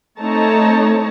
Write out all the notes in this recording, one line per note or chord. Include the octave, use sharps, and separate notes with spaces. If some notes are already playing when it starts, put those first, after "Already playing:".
A3 C4 D#4 C#5 A5 A#5